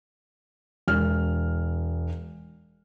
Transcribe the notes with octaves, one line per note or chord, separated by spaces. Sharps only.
E1 F6